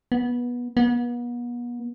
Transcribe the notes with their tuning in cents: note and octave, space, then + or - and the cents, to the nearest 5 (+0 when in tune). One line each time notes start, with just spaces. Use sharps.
B3 -20
B3 -40